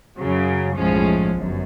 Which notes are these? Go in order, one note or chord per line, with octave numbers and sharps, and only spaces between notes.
F#2 C#3 F#3
B1 A2 F3 G#3 C#4
G1 F#2